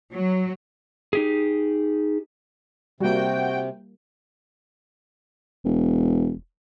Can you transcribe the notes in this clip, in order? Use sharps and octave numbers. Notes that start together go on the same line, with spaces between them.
F#3
D#4 G4 G#4
C3 G3 A#3 F#4 G5
E1